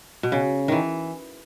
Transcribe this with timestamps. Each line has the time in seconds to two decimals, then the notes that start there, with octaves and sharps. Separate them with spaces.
0.23 B2
0.32 C#3
0.68 D#3 E3